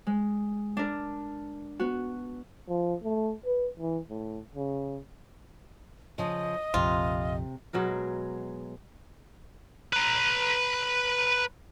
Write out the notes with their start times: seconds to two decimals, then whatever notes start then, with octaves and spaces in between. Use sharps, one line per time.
0.07 G#3
0.77 D4 A#4
1.80 B3 F#4
2.69 F3
3.04 A3
3.46 B4
3.80 E3
4.10 A2
4.55 C#3
6.18 C#3 F3 D#5
6.74 A#1 F2 C3 F4
7.73 B2 F#3 G#3 A#4
9.93 B4 A#5